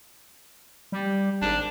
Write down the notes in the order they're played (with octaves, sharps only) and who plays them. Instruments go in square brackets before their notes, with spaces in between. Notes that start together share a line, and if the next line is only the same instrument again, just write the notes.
[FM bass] G3
[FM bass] G#1 [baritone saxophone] D4